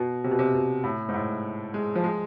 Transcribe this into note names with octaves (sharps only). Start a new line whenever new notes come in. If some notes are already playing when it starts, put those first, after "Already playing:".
Already playing: B2
C3
B2
C3
B2
A2
G#2
A2
G#3
F3
G#3